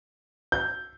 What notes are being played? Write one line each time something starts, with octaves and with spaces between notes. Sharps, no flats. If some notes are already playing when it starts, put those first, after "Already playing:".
G6